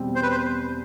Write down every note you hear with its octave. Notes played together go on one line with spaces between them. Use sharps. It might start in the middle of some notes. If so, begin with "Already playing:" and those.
Already playing: E2 B2 G3 C4
C5
B4
C5